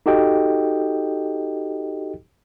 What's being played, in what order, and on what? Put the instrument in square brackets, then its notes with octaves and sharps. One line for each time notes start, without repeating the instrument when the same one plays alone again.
[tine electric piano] D#4 F#4 G4 A4 D#5 G5